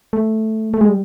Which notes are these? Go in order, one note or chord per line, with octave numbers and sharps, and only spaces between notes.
A3
A3
G#3
G3